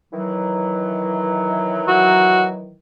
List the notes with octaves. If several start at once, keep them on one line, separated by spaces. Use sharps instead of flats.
D#3 E3 F#3
F#4